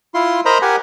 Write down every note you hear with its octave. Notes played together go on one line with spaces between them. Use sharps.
E4 F4 C6
A#4 C5 D#5 A#5 B5
G4 A#4 F#5 G#5